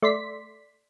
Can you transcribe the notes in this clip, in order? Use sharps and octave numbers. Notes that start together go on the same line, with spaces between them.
A3 D5 C6 B6